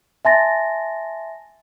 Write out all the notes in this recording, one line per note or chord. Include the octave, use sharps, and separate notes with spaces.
E5 G#5 A5 C6 A6 A#6